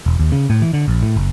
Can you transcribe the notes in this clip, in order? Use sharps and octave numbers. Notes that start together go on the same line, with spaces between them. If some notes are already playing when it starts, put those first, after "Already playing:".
E1
D#2
C#3
A2
E3
D3
A#1
A2
F#1